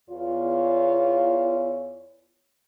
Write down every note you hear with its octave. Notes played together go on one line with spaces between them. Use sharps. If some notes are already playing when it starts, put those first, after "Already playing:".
E2 F4 C#5